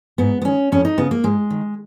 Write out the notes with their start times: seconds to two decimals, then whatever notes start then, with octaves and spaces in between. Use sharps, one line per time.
0.18 G#2 B3
0.42 B3
0.44 D#3 C#4
0.72 F2 C#4
0.85 D#4
0.98 C#3 B3
1.11 A#3
1.23 G#2 G#3
1.50 D#3